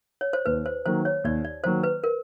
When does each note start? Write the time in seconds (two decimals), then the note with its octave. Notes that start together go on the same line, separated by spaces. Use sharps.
0.21 C#5
0.33 C5
0.46 D#2 B4
0.66 C5
0.86 D#3 F#3 A#3 C5
1.05 C#5
1.24 D#2 D5
1.45 D5
1.64 D#3 F#3 A#3 C5
1.83 B4
2.04 A#4